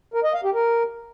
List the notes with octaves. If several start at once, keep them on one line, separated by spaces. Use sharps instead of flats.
A#4
D#5
F5
G4
A#4